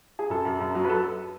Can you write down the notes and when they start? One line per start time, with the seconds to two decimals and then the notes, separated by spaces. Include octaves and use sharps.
0.19 G#4
0.30 F#2 A4
0.45 F#2
0.60 F#2
0.75 F#3
0.85 B4
0.89 A4